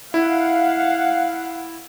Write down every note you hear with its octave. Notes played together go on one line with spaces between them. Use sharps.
E4 F5 F#5